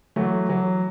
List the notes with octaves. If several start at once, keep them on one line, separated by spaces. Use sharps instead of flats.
E3 F#3 A3
E3 F#3